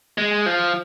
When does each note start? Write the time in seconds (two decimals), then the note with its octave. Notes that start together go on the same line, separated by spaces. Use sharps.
0.18 G#3
0.46 F3